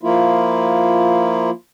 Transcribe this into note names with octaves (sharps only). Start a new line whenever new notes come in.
F3 A#3 E4 F4